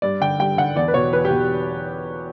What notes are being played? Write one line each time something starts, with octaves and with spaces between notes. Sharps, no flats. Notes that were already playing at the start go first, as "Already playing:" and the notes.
G2 D5
D3 G5
G2 G5
D3 F#5
E2 D5
B4
B2 C#5
E2 B4
G4
B2